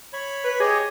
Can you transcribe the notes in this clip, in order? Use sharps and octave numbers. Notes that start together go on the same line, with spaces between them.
C#5 B5
B4
G4 G#4 C#5 D#5